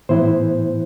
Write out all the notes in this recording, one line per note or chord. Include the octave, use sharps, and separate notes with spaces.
A2 E3 B3 E4 C5